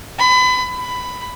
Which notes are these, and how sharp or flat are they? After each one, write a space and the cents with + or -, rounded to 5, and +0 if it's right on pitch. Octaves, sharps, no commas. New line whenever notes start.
B5 +30
B5 +10